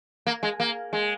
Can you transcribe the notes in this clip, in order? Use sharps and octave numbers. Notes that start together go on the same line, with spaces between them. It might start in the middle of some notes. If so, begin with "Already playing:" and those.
A#3
G#3
A#3
G#3